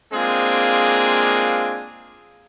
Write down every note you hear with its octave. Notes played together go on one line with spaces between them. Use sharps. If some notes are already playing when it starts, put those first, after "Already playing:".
G#3 A#3 C4 D4 F4 G#4